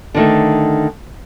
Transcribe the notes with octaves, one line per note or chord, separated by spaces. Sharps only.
D3 D#3 A3